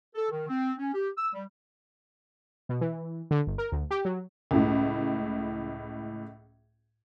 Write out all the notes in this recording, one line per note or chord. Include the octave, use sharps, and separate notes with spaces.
A4
D#3
C4
C#4
G4
E6
G3
B2
E3
D3
G1
A#4
D2
G4
F#3
C#2 A2